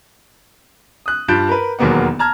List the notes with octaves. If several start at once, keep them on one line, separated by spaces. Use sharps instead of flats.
D#6 F#6
G2 F4 A5 F#6 G6 D7
A#4 B4
E1 D#2 F#3 A#3 B3 F#5
A5 A#5 F6 G#6